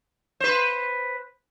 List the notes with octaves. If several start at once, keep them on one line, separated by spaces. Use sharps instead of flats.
B4 C5